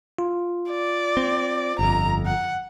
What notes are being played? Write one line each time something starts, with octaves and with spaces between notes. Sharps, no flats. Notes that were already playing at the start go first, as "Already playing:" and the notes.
F4
D5
C4
G1 F2 A#5
F#5